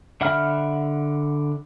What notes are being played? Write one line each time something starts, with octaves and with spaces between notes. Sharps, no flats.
D3 E5 F#5 B5 F6